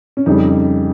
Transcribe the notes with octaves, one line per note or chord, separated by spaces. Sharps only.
C#4
F2 C#3 G3 D#4